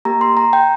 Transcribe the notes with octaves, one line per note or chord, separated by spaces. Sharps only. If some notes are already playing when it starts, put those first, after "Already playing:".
A#3 G4 A#5
C6
A#5
G5